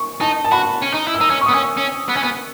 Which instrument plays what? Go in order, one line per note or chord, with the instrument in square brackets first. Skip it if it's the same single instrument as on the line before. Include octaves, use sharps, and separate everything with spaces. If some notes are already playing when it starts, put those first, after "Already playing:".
Already playing: [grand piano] C#6
[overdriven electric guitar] D#4 [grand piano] A5
[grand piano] A5
[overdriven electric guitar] F#4 [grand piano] B5
[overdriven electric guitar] C#4
D#4
E4
[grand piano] E6
[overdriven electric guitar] D#4
C#4
[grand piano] C#6
[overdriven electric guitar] B3 [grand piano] D#6
[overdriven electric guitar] C#4
C#4
B3
C#4
B3